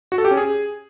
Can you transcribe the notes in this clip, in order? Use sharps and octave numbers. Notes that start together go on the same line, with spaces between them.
F#4
A4
G4
C#4
G#4